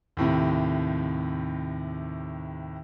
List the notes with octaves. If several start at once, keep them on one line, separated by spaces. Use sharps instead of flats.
D#2 A2 C3